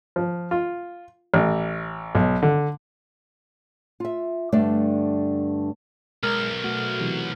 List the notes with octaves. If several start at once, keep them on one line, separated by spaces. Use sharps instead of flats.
F3
F4
A1
B1
D3
F4 E5
G2 D3 A3 D4 D5
B1 G#3 A#4 F6
A3 F#4
C3 E3 F#3